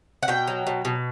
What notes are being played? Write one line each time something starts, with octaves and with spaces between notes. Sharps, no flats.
F#5
B2 G5
F#3
B2
B2